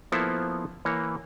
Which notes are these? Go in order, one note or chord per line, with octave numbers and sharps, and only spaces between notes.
F3 A#3 B3 E4 A4 C5
E3 A#3 C#5